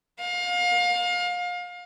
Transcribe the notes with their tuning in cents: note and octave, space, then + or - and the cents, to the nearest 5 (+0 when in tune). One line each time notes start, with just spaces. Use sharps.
F5 +30